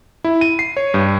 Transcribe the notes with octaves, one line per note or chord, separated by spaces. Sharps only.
E4
D#7
C7
C#5
G2